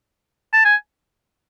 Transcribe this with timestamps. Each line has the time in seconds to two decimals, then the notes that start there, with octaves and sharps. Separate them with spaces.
0.53 A5
0.65 G#5